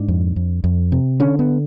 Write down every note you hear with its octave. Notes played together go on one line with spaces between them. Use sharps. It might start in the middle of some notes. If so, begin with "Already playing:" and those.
Already playing: G#2 D4
F2
F2
F2
C3
D3 C#4
B3